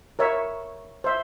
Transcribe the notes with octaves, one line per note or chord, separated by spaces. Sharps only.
A#4 C#5 E5
C5 E5